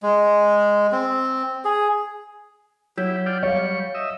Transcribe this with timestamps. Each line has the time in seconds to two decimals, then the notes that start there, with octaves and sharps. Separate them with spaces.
0.03 G#3
0.92 C4
1.65 G#4
2.98 F#3 E4 G4
3.26 F4 D5 G5
3.43 G3 C#5 F5 C#6
3.95 D#5 E5